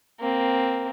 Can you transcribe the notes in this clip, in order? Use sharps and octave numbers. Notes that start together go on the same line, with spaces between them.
A#3 C4